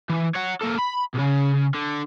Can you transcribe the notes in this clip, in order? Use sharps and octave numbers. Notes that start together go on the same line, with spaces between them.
E3
C#5 F#5
A#3 A4
B5
B1 C#3
D3